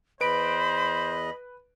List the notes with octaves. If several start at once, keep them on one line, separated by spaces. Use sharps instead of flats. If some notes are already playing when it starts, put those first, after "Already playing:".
E2 B4 C5 D#5 B5 D7